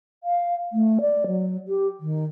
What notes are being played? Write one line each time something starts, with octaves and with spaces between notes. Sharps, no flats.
F5
A3
D5
F#3
G4
D#3